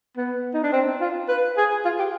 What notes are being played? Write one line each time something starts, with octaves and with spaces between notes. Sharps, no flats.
B3
D#4
D4
C4
F4
B4
G#4
F4
G4